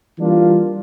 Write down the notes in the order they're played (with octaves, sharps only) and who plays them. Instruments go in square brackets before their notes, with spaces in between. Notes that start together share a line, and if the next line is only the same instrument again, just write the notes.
[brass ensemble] E3 G3 A#3 D4 F4